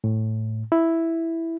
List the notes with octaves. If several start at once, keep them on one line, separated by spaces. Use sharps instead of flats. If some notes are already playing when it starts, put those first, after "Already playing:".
A2
E4